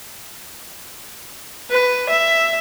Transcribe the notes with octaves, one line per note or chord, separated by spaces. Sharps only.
B4
E5